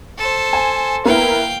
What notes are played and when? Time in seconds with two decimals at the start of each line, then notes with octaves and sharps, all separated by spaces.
0.18 A4 C5
0.53 G#5
1.05 A#3 B3 E4 F5 G5